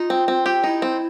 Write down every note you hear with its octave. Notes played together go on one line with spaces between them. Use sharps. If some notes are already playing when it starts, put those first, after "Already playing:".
Already playing: D#4 F4
C4
C4
G4
D#4 E4
C4